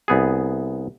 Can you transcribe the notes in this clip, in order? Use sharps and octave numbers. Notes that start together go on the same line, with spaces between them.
C2 B3 G#4